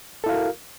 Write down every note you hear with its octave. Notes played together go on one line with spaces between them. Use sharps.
E4 F#4 A4 A#4 F5